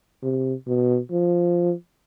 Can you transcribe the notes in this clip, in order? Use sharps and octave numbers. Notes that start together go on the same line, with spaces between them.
C3
B2
F3